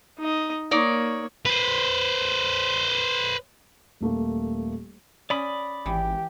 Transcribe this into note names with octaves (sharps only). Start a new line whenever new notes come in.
D#4 D#5
A#3 D#4 C#5 D5
B4 C5
D#1 A3 A#3
C#4 D5 B5 D#6
G#1 E3 G4